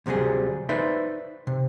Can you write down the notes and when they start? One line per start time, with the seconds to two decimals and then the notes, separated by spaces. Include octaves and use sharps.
0.06 D2 C3 F#3 G3 G#4
0.69 D#4 B4 C5 D5 E5
1.47 C3